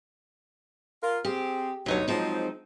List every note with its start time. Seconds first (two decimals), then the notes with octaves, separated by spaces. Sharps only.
1.02 F4 A#4
1.25 C4 G4 G#4
1.86 D2 G2 B2 F#3 D#4 C#5
2.08 F3 F#3 G#3 C4 D#4